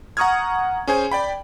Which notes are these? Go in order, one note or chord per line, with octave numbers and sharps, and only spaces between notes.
F#5 A#5 C#6 D#6 F6 G#6
C#4 G#4 C5 G#5
D5 G5 B5